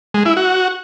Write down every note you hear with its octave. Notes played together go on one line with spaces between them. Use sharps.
G#3
E4
F#4